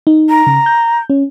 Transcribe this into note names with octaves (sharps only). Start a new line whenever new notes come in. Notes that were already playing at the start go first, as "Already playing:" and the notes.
D#4
A#5
C#3
G6
C#4